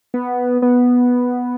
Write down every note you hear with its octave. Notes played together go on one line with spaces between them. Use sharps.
B3
B3